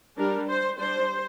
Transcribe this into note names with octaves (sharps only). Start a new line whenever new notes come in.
G3 D4 A#4
C5
G3 D4 C5